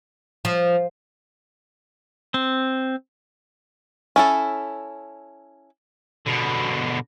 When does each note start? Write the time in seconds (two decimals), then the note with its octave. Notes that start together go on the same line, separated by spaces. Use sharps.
0.45 F3
2.34 C4
4.16 C#4 E4 A4
6.26 B2 D3